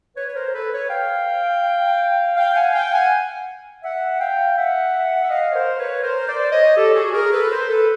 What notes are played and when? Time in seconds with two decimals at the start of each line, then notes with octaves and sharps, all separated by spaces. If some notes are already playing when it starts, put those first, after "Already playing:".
0.17 B4 C#5
0.29 C#5
0.35 A#4 C5
0.48 A#4
0.54 A4 B4
0.72 B4 C#5
0.90 F5 G5
2.36 F5 G5
2.55 F#5 G#5
2.74 F5 G5
2.92 F#5 G#5
3.84 E5 F#5
4.20 F5 G5
4.58 E5 F#5
5.24 E5
5.30 D#5 F5
5.50 C#5
5.55 A#4 C5
5.79 B4 C#5
6.03 A#4 C5
6.28 C5 D5
6.52 C#5 D#5
6.77 G4 A4
6.95 F#4 G#4
7.14 G#4 A#4
7.33 A4 B4
7.51 A#4 C5
7.68 A4 B4